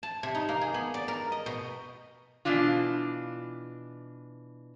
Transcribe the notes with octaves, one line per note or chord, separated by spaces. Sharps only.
A5
C3
D#4
A#3
G#4
B3
D5
A#4
D#5
B2
B2 E3 D4 F4